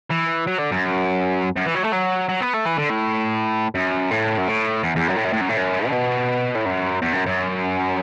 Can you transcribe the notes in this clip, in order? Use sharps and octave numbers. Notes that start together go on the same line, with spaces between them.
E3
F#3
D3
F#2
F#2
E3
F#3
A3
F#3
F#3
B3
A3
E3
D3
A2
F#2
A2
F#2
A2
E2
E2
F#2
A2
F#2
A2
F#2
A2
F#2
D3
B2
A2
F#2
E2
F#2
F#2